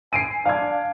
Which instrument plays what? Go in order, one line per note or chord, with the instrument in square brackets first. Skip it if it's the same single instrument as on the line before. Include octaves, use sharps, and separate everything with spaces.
[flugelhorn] G#5 [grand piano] C7 D7 D#7
[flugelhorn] D4 [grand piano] F5 G#6